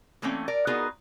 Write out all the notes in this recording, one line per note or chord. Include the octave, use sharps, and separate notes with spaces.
E3 A3 A#3 C4 C#4
A#4 D5
B3 D#4 F4 F#4 G#4 A#4